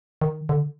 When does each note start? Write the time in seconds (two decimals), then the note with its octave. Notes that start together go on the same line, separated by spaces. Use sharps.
0.21 D#3
0.49 D3